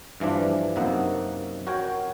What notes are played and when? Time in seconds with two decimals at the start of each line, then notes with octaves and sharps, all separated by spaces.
0.20 G2 E3 F3 D4
0.76 F#2 C3 A#3 D#4 F#5
1.67 F#4 A#4 C#5 G5